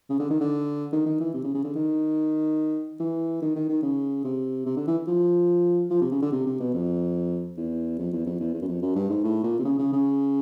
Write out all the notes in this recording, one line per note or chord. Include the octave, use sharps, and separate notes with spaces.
C#3
D3
D#3
D3
D#3
D#3
E3
C3
C#3
C#3
D3
D#3
E3
D#3
D#3
D#3
C#3
C3
C3
D3
E3
F3
F3
C3
C#3
D3
C3
C3
B2
F2
E2
F2
E2
F2
E2
E2
F#2
F2
F#2
G2
G#2
A2
A#2
C3
C#3
C#3
C#3